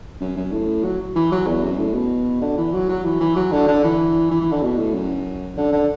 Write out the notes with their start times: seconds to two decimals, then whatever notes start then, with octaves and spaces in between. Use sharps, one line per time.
0.21 F#2
0.37 F#2
0.52 A2
0.84 F#3
1.15 E3
1.31 F#3
1.47 E2
1.63 F#2
1.78 A2
1.94 B2
2.41 D3
2.57 E3
2.73 F#3
2.89 F#3
3.04 E3
3.20 E3
3.36 F#3
3.52 D3
3.68 D3
3.84 E3
4.31 E3
4.41 E3
4.52 D3
4.62 B2
4.78 A2
4.94 F#2
5.57 D3
5.72 D3